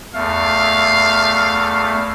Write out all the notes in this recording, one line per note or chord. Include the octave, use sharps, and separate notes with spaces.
E2 A3 F5